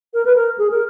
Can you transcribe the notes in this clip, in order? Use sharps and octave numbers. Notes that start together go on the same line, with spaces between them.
A#4
B4
A#4
G#4
A#4